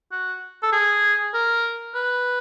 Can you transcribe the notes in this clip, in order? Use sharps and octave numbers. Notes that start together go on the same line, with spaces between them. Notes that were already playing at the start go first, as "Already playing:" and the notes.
F#4
A4
G#4
A#4
B4